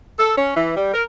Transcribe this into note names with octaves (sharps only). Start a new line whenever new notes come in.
A4
C#4
E3
G3
A#4